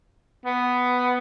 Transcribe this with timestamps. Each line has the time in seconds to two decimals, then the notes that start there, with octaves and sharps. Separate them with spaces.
0.45 B3